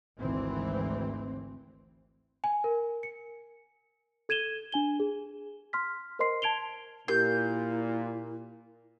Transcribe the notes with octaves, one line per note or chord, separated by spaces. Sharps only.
G#1 D2 E3 C4
G#5
A#4
C#7
A4 G#6 D#7 E7 G7
D4 G#5 G7
G#4
C6 F6 B6
A#4 C5 D#5 C6 C7
A5 G#6 D7 F7 G7
A#2 E4 G4 A#4 G6 C7